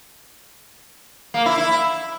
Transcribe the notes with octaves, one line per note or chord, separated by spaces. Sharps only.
A#3
E4
E4